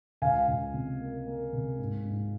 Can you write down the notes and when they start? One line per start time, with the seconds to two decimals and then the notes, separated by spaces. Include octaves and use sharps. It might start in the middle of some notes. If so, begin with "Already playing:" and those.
0.22 C#2 F5 G#5
0.48 C#2
0.74 C3
1.00 A#3
1.27 A#3
1.53 C3
1.79 G#2
2.05 G#2